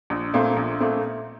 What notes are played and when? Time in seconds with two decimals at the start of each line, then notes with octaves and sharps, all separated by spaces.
0.10 A#1
0.34 A#2 A3 C4
0.57 A#1
0.80 A#2 A3 C4